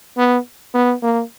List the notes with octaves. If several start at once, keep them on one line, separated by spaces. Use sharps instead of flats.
B3
B3
A#3